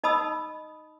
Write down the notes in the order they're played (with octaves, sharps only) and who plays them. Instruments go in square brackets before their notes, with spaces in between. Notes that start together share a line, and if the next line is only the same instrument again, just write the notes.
[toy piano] D#4 D#5 A5 B5 D#6 E6